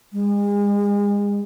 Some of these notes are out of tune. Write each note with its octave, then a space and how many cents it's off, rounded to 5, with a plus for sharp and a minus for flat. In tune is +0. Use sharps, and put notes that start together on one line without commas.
G#3 -35